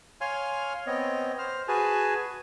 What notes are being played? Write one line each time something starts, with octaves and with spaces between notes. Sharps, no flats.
C#5 F5 G#5 C6 F6
B3 C4 C#5 D#5
C5 F6
F#4 G#4 B4 G#5 A5